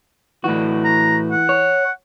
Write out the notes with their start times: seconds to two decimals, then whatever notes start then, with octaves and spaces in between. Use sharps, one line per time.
0.44 A2 E3 F#4
0.85 A#5
1.32 F#5
1.49 C#5